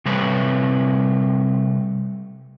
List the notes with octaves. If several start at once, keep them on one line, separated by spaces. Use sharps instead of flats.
C3 G3 A3 C4 B4 C#5